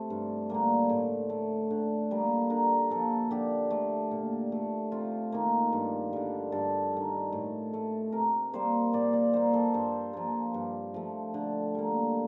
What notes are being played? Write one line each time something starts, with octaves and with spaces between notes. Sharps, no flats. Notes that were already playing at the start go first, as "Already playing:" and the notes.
Already playing: C3 A3 C5
G2
D3 G3 A#3
A2
A3
D3
G3 A#3
D3 A#4
F3 A#3 A4
D3 G4
A3
A#2
A3
C3 F4
D#3 A#3
G2
D3 G3
G2 A4
D#3 G3
A2
A3
C3 A#4
G3 A#3 C5
A#2 D5
D5
G3 A#3 C5
A4
G2 C5
F3 A#3
G2
F3 A3
D3
G3 A#3